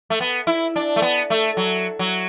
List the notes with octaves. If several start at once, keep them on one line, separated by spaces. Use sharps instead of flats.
A3
B3
E4
D4
A3
B3
A3
F#3
F#3